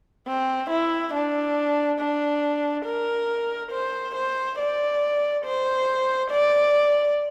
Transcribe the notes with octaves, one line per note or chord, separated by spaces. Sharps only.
C4
E4
D4
D4
A#4
C5
C5
D5
C5
D5